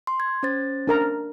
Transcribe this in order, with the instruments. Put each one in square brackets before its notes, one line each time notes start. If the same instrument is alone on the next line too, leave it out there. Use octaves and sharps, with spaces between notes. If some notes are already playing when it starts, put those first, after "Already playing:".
[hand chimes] C6
G#6
C#4 C5 A6
[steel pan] D4 A#4 A#5